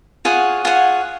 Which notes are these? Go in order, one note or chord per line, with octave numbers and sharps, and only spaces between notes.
F4 G#4 C#5 F#5
F4 G#4 C#5 F#5